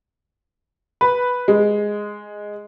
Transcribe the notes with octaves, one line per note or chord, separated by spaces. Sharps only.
B4
G#3